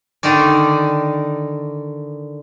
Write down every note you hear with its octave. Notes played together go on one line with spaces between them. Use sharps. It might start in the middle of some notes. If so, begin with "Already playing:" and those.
D3 D#3 D#4 D5